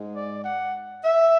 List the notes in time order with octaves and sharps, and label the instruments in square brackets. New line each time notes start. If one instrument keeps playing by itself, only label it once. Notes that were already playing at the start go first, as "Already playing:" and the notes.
Already playing: [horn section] G#2 G#3
D5
F#5
E5